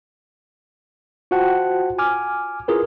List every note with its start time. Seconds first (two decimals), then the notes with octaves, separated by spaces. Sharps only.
1.31 F4 F#4 C5 F#5 G5 A5
1.99 G#5 D6 F6
2.68 E4 F4 G#4 A#4 B4